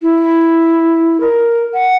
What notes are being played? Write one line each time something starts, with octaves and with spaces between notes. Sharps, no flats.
E4
A#4
F#5